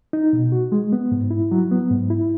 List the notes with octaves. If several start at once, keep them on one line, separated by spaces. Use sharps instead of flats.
D#4
B2
F#4
G#3
B3
G#2
E4
F#3
B3
G#2
E4